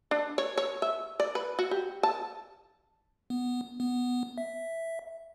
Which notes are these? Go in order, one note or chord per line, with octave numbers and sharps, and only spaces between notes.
D4
C#5
C#5
E5
D5
B4
F#4
G4
A5
B3
B3
E5